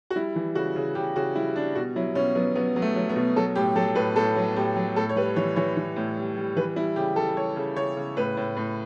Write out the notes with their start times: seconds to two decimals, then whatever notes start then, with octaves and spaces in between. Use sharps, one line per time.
0.10 F#4
0.15 G3 E4
0.36 E3
0.55 C#3 F#4
0.76 C#3
0.95 C#3 G4
1.16 C#3 F#4
1.35 G3 E4
1.56 G3 D4
1.75 B2 F#4
1.96 F#3 E4
2.15 B2 C#4
2.35 F#3 B3
2.55 F#3 B3
2.76 F#3
2.82 A3
2.96 F#3
3.09 B3
3.16 B2
3.36 F#3 A4
3.55 A2 G4
3.76 F#3 A4
3.95 A2 B4
4.16 A2 A4
4.36 F#3
4.56 A2 G4
4.76 F#3
4.96 A2 A4
5.09 C#5
5.16 G3 B4
5.36 E3 C#5
5.56 E3 C#5
5.77 E3
5.96 A2
6.17 G3
6.36 G3
6.56 E3 B4
6.76 G3 E4
6.96 C#3 G4
7.16 G3 A4
7.36 G3 C#5
7.56 C#3
7.76 C#3 C#5
7.97 C#3
8.16 A2 B4
8.37 A2
8.56 A2